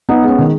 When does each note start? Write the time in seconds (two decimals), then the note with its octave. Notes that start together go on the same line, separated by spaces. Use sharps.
0.09 B3 D#4
0.23 G#3 C#4
0.38 D#3